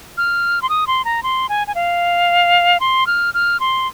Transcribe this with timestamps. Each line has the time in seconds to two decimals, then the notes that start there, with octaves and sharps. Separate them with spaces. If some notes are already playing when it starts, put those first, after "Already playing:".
0.17 F6
0.62 C6
0.69 D#6
0.87 C6
1.05 A#5
1.23 C6
1.49 G#5
1.67 G#5
1.75 F5
2.80 C6
3.07 F6
3.34 F6
3.60 C6